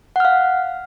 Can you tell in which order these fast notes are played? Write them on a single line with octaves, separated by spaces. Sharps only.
F#5 F6 F5